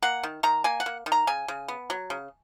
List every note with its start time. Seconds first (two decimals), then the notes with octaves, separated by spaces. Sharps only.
0.02 A#3 F#5
0.23 D#3
0.43 D#3 A#5
0.64 A#3 G#5
0.80 F#5
0.86 A#3
1.06 D#3
1.12 A#5
1.27 C#3 G#5
1.48 C#3
1.68 B3
1.90 F#3
2.10 C#3